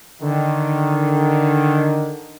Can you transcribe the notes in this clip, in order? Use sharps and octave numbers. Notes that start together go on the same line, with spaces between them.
D3 D#3